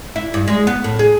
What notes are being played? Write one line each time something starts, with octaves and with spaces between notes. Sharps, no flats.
E4
G2
G#3
B3
A2
G#4